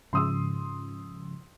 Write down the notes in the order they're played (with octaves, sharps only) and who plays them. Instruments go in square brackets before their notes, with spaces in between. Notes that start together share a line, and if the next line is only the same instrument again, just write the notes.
[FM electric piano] G#2 C#3 F3 [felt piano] C6 D#6 E6